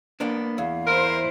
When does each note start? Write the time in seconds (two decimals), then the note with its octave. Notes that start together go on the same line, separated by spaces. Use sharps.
0.20 A#3 B3 D4
0.58 E2 F5
0.87 E4 A#4 C5